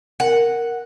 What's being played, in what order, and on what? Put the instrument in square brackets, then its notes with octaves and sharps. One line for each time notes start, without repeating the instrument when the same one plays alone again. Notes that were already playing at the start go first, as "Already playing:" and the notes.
[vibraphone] A#4 [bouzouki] F#5